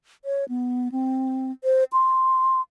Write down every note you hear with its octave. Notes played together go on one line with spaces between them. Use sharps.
C#5
B3
C4
C5
C6